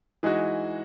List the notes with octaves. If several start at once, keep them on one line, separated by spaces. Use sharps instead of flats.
E3 G#3 D#4 F#4